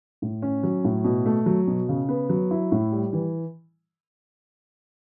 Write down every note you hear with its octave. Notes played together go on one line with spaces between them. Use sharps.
A2
C#4
F#3
A2
B2
A3
F#3
B2
C#3
B3
F#3
E4
A2
G3
E3